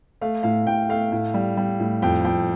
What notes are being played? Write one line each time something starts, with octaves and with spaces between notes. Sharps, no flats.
A3 F5
A2 F5
A2 G5
A3 F5
A2
G3
G3
A2
F2 G5
F2 G5